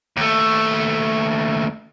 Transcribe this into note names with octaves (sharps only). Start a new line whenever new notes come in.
D#2 A3